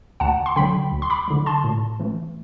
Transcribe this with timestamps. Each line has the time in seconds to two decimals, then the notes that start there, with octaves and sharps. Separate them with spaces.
0.20 D2 F#5 A5
0.46 C6
0.56 D3 F#3 G5 B5
0.92 D2
1.02 C6
1.10 B5 D6
1.28 D3 F#3
1.46 A5 C6
1.64 A2
2.00 E3 A3